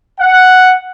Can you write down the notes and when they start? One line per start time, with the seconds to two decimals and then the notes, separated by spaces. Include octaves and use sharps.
0.20 F#5